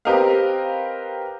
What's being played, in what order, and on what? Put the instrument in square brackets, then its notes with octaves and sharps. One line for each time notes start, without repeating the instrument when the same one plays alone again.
[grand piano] C4 G4 A#4 B4 D#5 F5